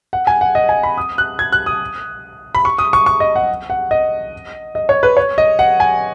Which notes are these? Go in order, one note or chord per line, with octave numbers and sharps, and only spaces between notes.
F#5
G#5
F#5
D#5
G#5
B5
D#6
F#6
G#6
F#6
D#6
B5
C#6
D#6
C#6
C#6
D#5
F#5
F#5
D#5
D#5
C#5
B4
C#5
D#5
F#5
G#5